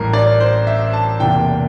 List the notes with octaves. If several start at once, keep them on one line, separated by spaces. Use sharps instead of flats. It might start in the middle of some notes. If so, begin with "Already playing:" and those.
Already playing: A1 A2 G3 A#4
D5
C5
E5
A5
E1 E2 C3 E3 A#3 G5